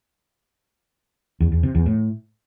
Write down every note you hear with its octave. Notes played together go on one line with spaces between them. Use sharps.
E2
E2
C3
E2
A2